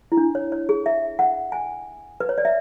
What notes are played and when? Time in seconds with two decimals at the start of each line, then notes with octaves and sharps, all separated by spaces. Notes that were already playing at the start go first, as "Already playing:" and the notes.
0.12 E4
0.17 D4
0.35 C#5
0.52 C#5
0.69 G#4
0.86 E5
1.19 F#5
1.52 G#5
2.20 B4
2.29 C#5
2.38 D5
2.45 E5